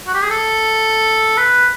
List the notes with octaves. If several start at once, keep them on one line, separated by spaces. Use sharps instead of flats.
F#4
G4
G#4
A4
B4